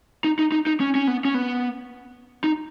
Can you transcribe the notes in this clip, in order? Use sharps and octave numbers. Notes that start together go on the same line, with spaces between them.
D#4
D#4
D#4
D#4
C#4
C#4
B3
C#4
B3
D#4